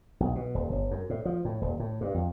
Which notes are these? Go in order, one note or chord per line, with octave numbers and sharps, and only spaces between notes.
B1
B2
D#1
G1
F#2
A2
F3
A2
D#1
A2
G2
F2